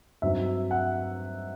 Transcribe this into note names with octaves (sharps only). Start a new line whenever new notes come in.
G2 F#3 C4 D#4 E5
F#5